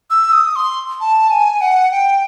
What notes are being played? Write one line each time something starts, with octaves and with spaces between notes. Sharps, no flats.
E6
D#6
C6
A5
G#5
F#5
G5